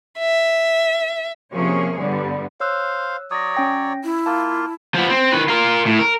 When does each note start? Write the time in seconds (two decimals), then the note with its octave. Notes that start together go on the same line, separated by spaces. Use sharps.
0.19 E5
1.53 C3 F3 A#3 C#4 G#4 C#5
1.99 G2 D3 G3 B3
2.60 C5 C#5 F5 E6 F#6
3.31 F#3 C#5 D5 D#6 A#6
3.54 C#4 G5 A#6
4.04 E4
4.26 A#3 F4 A5
4.94 F3 B3
5.09 C4
5.32 D#3 B4
5.48 F4 A#4
5.85 A2
5.99 A#4